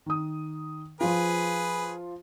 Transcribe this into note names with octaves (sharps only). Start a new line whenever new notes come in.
D#3 D#6
F3 F4 G#4 B4